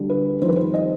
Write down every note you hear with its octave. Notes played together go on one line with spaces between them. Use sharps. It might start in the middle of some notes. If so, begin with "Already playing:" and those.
Already playing: D2 D3 G3
B4
F2 D#3 G3 C5
B4
C5
D#5